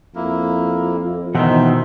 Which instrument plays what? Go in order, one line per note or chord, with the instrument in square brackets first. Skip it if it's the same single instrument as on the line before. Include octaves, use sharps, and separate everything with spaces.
[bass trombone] F2 [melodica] A#3 E4
[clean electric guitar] B2 D#3 [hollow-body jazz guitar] E3 F#5 A#5 [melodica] D#4 C5 E5